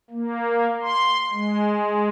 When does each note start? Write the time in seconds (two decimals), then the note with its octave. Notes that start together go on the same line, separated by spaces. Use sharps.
0.10 A#3
0.82 C6
1.31 G#3